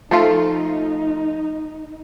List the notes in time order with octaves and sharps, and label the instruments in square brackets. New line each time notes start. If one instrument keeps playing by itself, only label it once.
[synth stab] F3 A3 F4 [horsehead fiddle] D#4